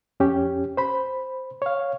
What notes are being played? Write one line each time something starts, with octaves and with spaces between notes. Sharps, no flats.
F2 C#4 G4
C5 B5
C#5 F5